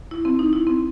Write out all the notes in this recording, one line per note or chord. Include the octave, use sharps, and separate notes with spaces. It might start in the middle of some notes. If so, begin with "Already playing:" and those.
E4
C4
D#4
E4
C4